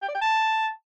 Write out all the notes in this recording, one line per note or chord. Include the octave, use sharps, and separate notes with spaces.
G5
D5
G5
A5